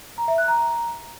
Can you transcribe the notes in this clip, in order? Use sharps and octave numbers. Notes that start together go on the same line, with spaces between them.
A#5
E5
F#6
A#5